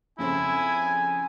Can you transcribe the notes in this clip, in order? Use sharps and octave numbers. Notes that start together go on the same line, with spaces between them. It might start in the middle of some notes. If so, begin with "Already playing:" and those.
F2 C#3 C4 E4 G#5